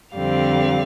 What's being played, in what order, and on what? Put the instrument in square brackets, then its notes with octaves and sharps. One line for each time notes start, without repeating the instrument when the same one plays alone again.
[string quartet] F2 D3 G3 C4 F5